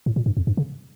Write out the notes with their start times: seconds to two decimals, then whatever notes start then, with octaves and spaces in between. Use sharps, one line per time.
0.06 A2
0.16 A#2
0.26 G2
0.37 F2
0.47 G2
0.57 C#3